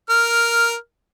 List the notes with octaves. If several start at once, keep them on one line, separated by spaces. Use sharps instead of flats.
A#4 F6